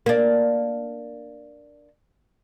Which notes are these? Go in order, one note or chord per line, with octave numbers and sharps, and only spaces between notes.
A#3 D4